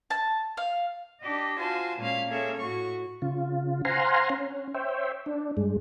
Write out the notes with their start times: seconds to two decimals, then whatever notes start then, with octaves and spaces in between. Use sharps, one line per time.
0.10 A5
0.57 F5
1.21 D4 G4 D#5
1.59 F4 F#4 C5 G#5 A5
1.98 A#2 G#3 C#4 F5
2.28 A#3 C#4 G#4 A4 C#5 E5
2.57 A2 F#4 C#6
3.22 C#3 F4
3.85 C5 F5 F#5 G#5 A#5 C6
4.30 C#4
4.74 C5 C#5 E5 G5
5.26 D4
5.57 G2 G#3